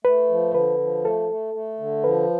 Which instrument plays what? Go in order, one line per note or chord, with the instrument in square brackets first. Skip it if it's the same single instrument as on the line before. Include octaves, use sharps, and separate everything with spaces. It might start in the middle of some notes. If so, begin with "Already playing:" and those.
[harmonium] A3 [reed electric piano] B4
[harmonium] F3
[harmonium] D3 [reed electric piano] B4
[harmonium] F3
[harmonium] A3 [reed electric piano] A4
[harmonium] A3
A3
D3
[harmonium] F3 [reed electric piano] B4